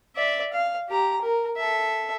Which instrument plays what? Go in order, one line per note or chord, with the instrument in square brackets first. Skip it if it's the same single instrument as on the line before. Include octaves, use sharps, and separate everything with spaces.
[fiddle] D5 E5
F5
G4 A#5
A#4
A4 E5